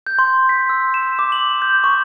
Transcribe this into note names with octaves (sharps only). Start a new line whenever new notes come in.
G6
C6
B6
E6
E7
D6
F#7
G6
C#6